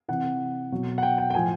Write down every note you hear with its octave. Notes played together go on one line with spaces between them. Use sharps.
C3 E3 F#5
B2 F#3
F#5
G5
G5
G5
A2 F3 G#5